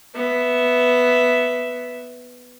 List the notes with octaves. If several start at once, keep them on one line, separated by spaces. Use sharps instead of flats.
B3 E5